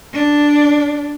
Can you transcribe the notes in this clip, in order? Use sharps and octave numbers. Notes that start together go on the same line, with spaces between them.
D4